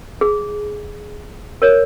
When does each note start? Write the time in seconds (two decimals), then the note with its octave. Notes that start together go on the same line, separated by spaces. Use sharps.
0.21 G#4
1.62 A#4 C#5